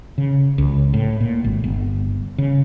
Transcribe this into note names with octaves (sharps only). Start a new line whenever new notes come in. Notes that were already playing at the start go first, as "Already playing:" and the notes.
C#3
C#2
A2
A#2
G#1
G1
C#3